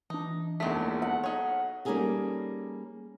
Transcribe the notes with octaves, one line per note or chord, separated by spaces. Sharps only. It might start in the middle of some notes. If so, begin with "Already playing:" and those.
E3 D4 D#4
E1 A#1 E2 D#3 A3 B6
B1 F#5
D#4 C#5
G3 A#3 C#4 D#4 G#4 A4